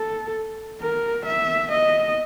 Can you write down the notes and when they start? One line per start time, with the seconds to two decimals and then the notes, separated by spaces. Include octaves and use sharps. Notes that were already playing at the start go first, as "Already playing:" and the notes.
Already playing: A4
0.81 A#4
1.26 E5
1.72 D#5